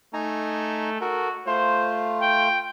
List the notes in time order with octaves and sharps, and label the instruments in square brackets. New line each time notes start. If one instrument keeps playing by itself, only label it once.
[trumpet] A3 [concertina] D#4 G#5 A#5
[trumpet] F#4 [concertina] A4 A#4
[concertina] A3 F4 [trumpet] C5
[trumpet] G5